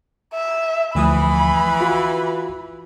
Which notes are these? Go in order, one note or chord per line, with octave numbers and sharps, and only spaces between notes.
E5
D2 E3 F3 B5 D#6
F4 F#4